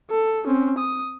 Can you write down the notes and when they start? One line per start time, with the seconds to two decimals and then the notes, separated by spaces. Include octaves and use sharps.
0.10 A4
0.47 C4 C#4
0.79 D#6